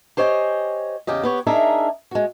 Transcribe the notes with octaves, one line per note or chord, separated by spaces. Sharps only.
G4 C5 C#5 D#5 G5 G#5
E2 C#3 G4 D#5
B3 G4 C#5
D4 D#4 G#4 A#4 E5
G#3 F#4